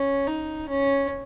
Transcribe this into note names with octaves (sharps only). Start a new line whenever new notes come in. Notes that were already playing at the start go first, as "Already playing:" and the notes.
Already playing: C#4
D#4
C#4